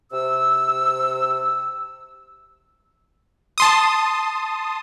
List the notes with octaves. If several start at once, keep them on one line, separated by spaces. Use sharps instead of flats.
C3 E6
A5 C6 D#6